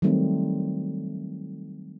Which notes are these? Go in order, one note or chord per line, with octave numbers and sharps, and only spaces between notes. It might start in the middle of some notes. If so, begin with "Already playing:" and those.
D#3 F#3 G3 A3 C4 D#4